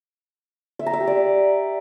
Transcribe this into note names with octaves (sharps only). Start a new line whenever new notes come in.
E5
A#5
E5
G4
D5